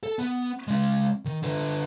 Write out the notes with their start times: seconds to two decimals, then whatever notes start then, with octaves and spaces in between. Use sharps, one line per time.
0.03 A4
0.19 B3
0.68 G#3 C#4
1.25 D#3
1.43 D3 B4